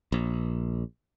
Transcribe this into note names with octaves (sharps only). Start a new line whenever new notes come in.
A#1